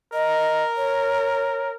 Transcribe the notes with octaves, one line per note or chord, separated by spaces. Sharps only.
A#4 D#5
C#5